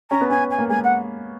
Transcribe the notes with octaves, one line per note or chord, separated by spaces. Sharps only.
C#4 A#5
B3
C#4 G#5
G#5
A#3
G#3 G#5
F#5